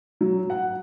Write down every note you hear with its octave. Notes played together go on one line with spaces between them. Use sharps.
F#3
F#5